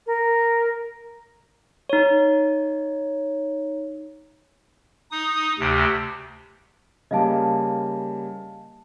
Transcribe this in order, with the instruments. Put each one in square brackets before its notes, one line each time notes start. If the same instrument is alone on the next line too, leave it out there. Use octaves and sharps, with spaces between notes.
[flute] A#4
[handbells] D#4 C#5
[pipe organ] D#4 D#6
D2 C3
[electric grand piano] C#3 G3 A#3 [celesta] D#5 F5 A5